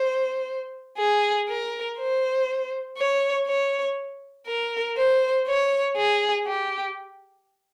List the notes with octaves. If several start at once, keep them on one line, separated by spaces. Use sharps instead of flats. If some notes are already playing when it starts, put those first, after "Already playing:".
Already playing: C5
G#4
A#4
C5
C#5
C#5
A#4
C5
C#5
G#4
G4